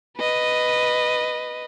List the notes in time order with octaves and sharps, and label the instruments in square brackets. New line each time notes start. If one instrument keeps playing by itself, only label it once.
[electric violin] B4 D#5